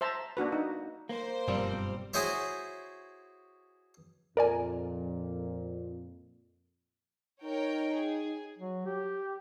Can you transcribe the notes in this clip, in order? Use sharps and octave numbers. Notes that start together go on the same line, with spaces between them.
C5 E5 A5 A#5
A#3 D4 F#4 B4
D#4
A#3 C5
F#1 G2 B2 F3 G3 C4
E4 F#4 G#4 C5 C#5 E5
F2 A#2 A#4 D5 G#5
D#4 A#4 C#5 G5
G#4
F#3
G4